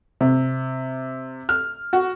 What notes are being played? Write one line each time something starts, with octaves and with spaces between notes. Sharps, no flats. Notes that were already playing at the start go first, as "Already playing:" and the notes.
C3
F6
F#4